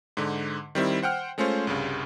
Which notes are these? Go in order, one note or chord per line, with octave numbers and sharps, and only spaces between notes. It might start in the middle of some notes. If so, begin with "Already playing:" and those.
G#2 D3
D#3 G3 C4 E4
C5 F#5 G5 F6
G#3 A3 C#4 F4 C5
C2 G2 C#3